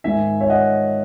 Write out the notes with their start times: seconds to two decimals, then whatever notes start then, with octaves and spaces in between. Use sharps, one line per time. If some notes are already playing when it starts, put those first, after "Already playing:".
0.04 G#2 D#3 E5 G#5
0.41 C#5 E5
0.49 D#5 F#5